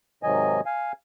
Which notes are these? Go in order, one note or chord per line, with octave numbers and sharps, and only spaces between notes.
G#2 C3 D#3 F#3 D#5 G#5
F5 G#5